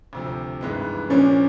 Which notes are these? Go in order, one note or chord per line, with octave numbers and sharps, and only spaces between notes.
D2 C3 F3
G#1 G2 E3 G#3 B3
A#2 F3 A#3 C#4 D4